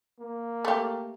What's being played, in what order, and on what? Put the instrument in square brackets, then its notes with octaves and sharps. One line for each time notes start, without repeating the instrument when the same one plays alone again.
[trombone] A#3
[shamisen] A3 G4